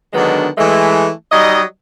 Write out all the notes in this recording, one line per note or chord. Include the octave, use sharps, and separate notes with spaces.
D3 D#3 F#3 G#3 B3 D4
E3 G#3 A3
F#3 G3 D#4 D#5